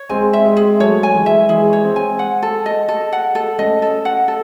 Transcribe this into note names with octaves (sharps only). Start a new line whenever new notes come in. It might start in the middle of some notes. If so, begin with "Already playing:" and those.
Already playing: C#5
G#3 C4 G#5
E5
G#3 C4
G#4
F#3 A3 C#5
G#5
E3 G#3
E5
E3 G#3 G#4
C#5
G#3 C4
G#5
F#5
A4
D#5
A4
F#5
A4
A3 C#4 D#5
A4
F#5
A4